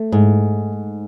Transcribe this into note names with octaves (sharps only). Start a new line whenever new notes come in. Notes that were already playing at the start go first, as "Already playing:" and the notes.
Already playing: A3
G#2